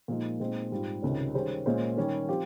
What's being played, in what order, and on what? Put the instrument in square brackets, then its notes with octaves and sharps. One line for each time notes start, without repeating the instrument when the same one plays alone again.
[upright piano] A#2 F3 G#3 D#4
A#2 G#3 C4 D#4
G#2 G3 C4 F4
C#2 C3 D#3 G#3 C#4
D#3 G3 C#4 G#4 C5
A#2 G#3 C#4 G#4 C5
D#3 G3 C#4 G4
F3 C4 G4